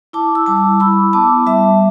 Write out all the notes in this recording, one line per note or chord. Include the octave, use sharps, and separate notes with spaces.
E4 A5 D6
E6
G3 A5 D6
E4 B5 E6
B3 A5 D6
G3 E5 A5